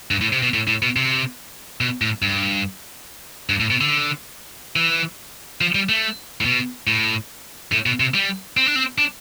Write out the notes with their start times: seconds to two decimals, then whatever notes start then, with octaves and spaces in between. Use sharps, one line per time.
0.11 G2
0.21 A2
0.32 C3
0.43 B2
0.54 A2
0.67 A2
0.82 B2
0.96 C3
1.81 B2
2.02 A2
2.22 G2
3.50 G2
3.60 A2
3.70 B2
3.81 D3
4.76 E3
5.61 F3
5.75 G3
5.89 A3
6.41 A2
6.45 B2
6.87 A2
7.72 A2
7.86 B2
8.00 C3
8.14 G3
8.57 C4
8.66 D4
8.76 C4
8.98 D4